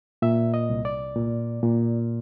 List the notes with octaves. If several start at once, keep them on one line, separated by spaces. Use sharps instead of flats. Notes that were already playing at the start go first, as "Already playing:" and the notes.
A#2 E5
D#5
C2
D5
A#2
A#2